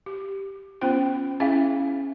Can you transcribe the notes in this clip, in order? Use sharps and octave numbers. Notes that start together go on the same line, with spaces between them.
G4
B3 C#4 F4 C5 G5
C#4 E4 G#4 E5 F5 G#5